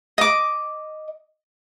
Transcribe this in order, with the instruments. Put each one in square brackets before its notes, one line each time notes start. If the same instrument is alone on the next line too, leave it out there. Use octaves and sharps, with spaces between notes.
[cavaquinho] D#5 D6